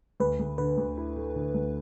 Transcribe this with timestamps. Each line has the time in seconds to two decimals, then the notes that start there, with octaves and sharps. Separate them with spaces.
0.20 D2 B4
0.39 D2
0.58 D3 B4
0.77 D2
0.97 E4
1.16 A3
1.35 D3
1.54 D2